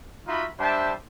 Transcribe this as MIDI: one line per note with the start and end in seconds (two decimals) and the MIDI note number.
0.28 0.47 63
0.28 0.47 65
0.28 0.47 66
0.28 0.47 76
0.28 0.47 83
0.60 0.93 55
0.60 0.93 62
0.60 0.93 72
0.60 0.93 76
0.60 0.93 79
0.60 0.93 81